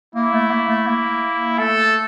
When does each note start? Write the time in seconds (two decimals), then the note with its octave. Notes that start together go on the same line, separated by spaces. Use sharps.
0.15 A#3 E4
0.34 A3
0.51 A#3
0.69 A3
0.87 A#3
1.58 A3 A4